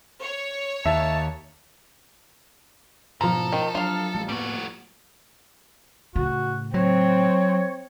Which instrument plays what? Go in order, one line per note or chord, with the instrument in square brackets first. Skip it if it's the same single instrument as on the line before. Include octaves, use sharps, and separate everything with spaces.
[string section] C#5
[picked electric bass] D#2 [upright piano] E5 [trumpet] A5
[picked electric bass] G#2 B2 [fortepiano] F3 A#5 [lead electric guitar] A4
[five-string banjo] D#3
[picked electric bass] F#3 D4 [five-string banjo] F4 F5
[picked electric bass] A1 G3 G#3
[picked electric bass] A2 A#3 B3 [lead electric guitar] G3 F#4
[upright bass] A2 C#3 [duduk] F#4
[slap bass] F#3 [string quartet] C4 [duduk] C#5